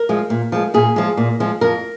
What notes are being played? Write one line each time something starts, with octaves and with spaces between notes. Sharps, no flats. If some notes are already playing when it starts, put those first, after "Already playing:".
Already playing: A#4
F3 G#3
A#2
F3 G#3
A#2 G#4
F3 G#3
A#2
F3 G#3
F2 A#4